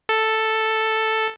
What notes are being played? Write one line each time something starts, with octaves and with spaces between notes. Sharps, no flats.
A4